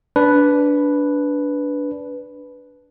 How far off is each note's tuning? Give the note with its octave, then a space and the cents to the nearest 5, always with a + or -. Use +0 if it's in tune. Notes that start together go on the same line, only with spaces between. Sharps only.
D4 -15 B4 +0